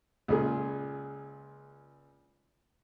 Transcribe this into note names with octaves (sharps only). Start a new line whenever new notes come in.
C#2 A#2 G#4